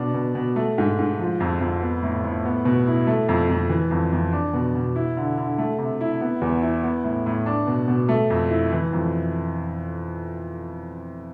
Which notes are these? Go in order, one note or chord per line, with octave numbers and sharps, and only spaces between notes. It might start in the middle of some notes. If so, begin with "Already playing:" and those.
Already playing: B2 D4
B2
B2
A3
G#2
G#2
F3
F2
F2
B3
A2
A2
B3
B2
E4
A3
F2
F2
E3
F2
F2
D4
B2
B2
E4
D3
D3
A3
C3
E4
B3
E2
E4
B3
A2
A2
D4
B2
B2
A3
F2
E4
E3
F2